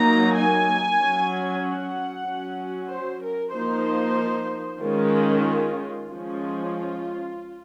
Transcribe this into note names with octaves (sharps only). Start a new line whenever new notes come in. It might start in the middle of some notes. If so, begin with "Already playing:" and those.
Already playing: F#3 A#3 D#4 A#5
G#5
F#3 C#4
F#5
F#3 C#4
C5
A#4
F3 A#3 D#4 C5
D#3 G#3 C#4 F4
F3 G#3 C#4 F4